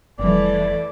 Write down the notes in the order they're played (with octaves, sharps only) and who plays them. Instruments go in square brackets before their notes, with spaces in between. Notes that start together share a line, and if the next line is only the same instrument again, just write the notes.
[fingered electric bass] F1 G3 [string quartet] E3 A3 [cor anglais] D5